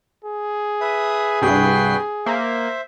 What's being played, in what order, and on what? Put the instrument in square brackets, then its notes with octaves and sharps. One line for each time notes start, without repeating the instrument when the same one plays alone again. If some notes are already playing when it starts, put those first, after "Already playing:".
[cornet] G#4
[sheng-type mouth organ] B4 E5 D#6
[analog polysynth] C2 G2 C7 [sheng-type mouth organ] F#4 B4 G5
[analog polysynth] A#3 [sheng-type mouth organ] C5 E5